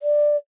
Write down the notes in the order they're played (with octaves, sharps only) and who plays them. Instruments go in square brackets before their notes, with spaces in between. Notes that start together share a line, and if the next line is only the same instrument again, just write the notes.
[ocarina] D5